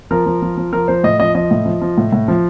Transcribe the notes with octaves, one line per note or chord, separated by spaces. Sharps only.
F3 A#4
F3
F3
F3
F3 A#4
F3 C5
A2 D#5
F3 D#5
F3 D#5
A2
F3
F3
A2
A2
F3